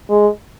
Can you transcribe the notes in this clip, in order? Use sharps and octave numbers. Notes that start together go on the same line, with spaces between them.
G#3